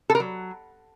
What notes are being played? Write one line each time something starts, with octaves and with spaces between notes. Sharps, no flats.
A4
A#4
F#3